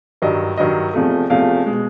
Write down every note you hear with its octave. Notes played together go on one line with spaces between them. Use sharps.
G2 D#3 F#3 D#5
G2 D#3 F#3 D#5
E2 C3 F3 A3
E2 C3 F3 A3 F5
B2 G#3